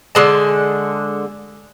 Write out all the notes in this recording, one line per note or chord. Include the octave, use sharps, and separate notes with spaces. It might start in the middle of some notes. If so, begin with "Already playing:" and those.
D3 G#3 A5